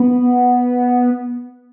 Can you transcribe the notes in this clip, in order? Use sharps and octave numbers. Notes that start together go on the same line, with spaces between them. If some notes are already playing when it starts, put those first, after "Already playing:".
Already playing: B3